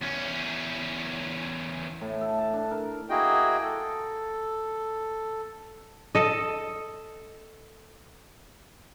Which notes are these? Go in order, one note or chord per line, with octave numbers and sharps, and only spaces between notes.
E2 C#4
A2
A4
A5
D4
A#4
A#3 E4 F#4 G#4 D#5 G5
A4
A4 D#5